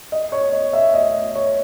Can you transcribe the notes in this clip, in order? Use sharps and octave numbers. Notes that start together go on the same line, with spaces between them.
D#5
C#5
D#5
E5
D#5
C#5